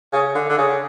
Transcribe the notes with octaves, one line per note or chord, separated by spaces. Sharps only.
C#3
D3
D3
C#3